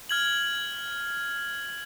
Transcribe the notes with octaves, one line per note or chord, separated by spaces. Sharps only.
F6 G#6 F#7